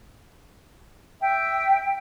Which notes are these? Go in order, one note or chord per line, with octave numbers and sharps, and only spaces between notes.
E5 G5